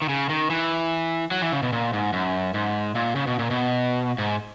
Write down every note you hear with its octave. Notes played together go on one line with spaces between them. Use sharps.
D#3
C#3
D#3
E3
F#3
E3
C#3
B2
A#2
G#2
F#2
G#2
A#2
C#3
B2
A#2
B2
G#2